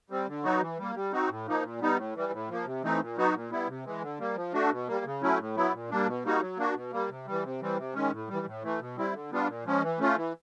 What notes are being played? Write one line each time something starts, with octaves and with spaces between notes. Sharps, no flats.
G3 C4
D3
F#3 B3 D#4 F#4
E3
G3 A#3
G3
C4 D#4 F#4
A2
F3 A#3 D#4
A#2
G3 B3 D#4
A2
E3 G3
A2
F3 A#3
C3
E3 A3 C4 D#4
A#2
F#3 B3 D#4 F#4
A#2
G3 B3 E4
C3
E3 G#3
D3
G3 A#3
F3
A3 D4 F#4
B2
G3 A#3
C#3
F#3 A3 C#4 E4
A2
F#3 B3 E4
A#2
G3 A#3 D4
B2
G3 A#3 D#4 F#4
F#3
A#3 D4 F#4
B2
G3 A#3
C3
E3 G3
C3
E3 G3 C4
C3
D#3 G#3 C#4
A2
E3 G3
A2
E3 A3
B2
G3 C4 E4
D3
G3 B3 D4 F4
A#2
F3 G#3 C#4
E3
A3 C#4 F4
E3